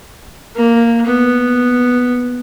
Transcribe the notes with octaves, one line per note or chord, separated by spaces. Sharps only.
A#3
B3